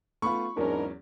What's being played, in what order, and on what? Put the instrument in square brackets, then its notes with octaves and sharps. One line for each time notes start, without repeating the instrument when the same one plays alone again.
[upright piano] A3 B3 F4 [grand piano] B5 C#6
[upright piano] E2 F#3 C#4 [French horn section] G#2 D4 A#4